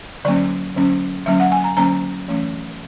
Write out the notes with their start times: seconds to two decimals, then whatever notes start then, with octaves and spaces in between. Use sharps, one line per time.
0.25 D3 F#3 A#3 C#4 D5
0.76 D3 F#3 A#3 C#4
1.26 D3 F#3 A#3 C#4 E5
1.40 F#5
1.52 G#5
1.64 A#5
1.77 D3 F#3 A#3 C#4 A#5
2.28 E3 A3 C#4